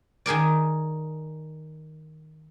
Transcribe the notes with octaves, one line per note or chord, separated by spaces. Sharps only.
D#3 G#4 A#4 D5